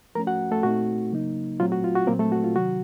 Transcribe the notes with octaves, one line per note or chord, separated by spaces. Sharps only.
F3 A3 C#4 A#4 A#5
F#4 F#5
A3 A4
A#2 A3 C4 D#4 F#4
C#3 F#3 A#3 D#4
A#2 F#3 A3 C4 F4
F#4
F4
F#4
A#2 F#3 A#3 C4 A#4
A3 A4
F#4
F4
C3 D#3 F#3 F#4